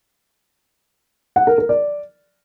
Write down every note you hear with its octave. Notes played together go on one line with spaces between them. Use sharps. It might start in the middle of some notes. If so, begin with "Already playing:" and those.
F#5
A#4
A#4
D5